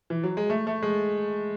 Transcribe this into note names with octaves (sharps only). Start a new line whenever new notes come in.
E3
F#3
G#3
A3
A3
G#3